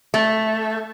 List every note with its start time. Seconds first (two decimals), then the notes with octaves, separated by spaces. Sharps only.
0.14 A3